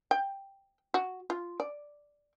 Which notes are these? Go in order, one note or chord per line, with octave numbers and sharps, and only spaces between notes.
G5
F#4
F4
D5